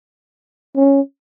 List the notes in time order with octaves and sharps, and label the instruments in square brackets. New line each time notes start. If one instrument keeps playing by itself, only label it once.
[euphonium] C#4